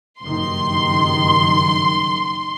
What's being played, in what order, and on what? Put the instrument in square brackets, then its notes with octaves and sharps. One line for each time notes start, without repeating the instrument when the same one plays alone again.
[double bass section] F#1 G2 D#3 [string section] C6